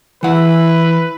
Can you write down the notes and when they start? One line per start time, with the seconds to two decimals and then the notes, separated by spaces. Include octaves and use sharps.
0.23 E3 E4 B4 F#5